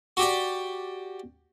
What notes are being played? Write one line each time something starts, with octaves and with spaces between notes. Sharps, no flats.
F#4 G4 D5